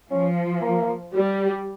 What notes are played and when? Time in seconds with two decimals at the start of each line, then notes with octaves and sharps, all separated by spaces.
0.10 F3 C#4
0.62 A#3
1.13 G3